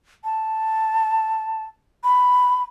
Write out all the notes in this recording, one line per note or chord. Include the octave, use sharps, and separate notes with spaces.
A5
B5